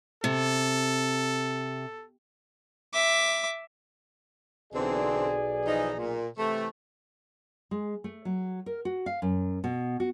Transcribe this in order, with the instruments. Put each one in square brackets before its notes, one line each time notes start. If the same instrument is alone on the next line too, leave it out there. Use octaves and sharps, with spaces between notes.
[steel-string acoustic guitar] C3 [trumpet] A4
[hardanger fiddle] E5 D6
[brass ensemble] B1 G#4 D5 [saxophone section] D3 E3 C4
[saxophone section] E3 F3 D#4
A#2
C3 E3 A3
[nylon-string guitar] G#3
A3
F#3
A#4
F#4
F5
F#2
B2
F#4